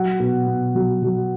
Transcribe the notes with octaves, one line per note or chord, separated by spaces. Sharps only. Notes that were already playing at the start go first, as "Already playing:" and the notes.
Already playing: F#3 F#5
B2
B2
F#3
F#3